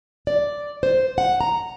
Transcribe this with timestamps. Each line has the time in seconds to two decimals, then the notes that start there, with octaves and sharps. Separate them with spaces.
0.27 D5
0.83 C5
1.18 F#5
1.41 A#5